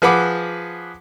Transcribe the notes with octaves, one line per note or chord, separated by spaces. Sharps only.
F3 G#4 B4 F#5 B5 D6